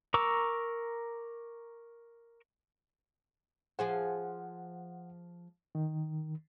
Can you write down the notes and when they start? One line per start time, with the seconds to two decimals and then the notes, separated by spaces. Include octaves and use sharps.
0.14 A#4 A#5 C#6 D6 E6
3.79 F3 G#4 C5 F#5
5.75 D#3